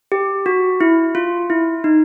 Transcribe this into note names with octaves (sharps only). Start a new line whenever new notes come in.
G4
F#4
E4
F4
E4
D#4